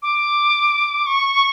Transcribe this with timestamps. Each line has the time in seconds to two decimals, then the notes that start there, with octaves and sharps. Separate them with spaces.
0.03 D6
1.06 C#6